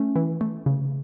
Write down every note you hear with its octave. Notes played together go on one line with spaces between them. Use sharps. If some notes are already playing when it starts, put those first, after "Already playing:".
Already playing: A3 C#4
E3
A3
C#3